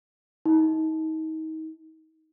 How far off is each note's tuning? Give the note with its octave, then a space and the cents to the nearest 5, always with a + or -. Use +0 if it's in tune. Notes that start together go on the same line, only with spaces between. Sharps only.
D#4 +30